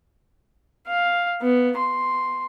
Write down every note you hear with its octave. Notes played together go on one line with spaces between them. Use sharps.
F5
B3
C6